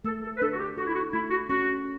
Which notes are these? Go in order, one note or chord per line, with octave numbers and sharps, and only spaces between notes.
A3 A4
A4
B4
D4 A4
F#4
G4
F#4 A4
E4
F#4
A3 E4
F#4
C#4 F#4